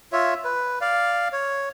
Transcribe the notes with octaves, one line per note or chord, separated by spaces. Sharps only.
F4 C#5 E5
B4
D5 F5
C#5